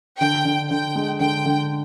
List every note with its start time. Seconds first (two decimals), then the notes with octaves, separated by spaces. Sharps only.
0.20 D3 G5
0.45 D3
0.70 D3 G5
0.96 G#3
1.20 D3 G5
1.46 D3